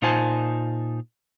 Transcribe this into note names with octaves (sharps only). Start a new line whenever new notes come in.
A#2 D#4 F4 C5 G#5 A5